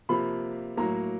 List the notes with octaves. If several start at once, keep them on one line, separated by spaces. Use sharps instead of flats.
C3 F3 A#3 B5
A2 F#3 A#3 A#5